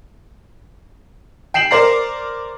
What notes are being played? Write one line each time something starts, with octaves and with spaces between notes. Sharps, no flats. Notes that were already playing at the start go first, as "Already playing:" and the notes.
G5 C7 E7 F#7
A#4 C5 D5 A#5 C7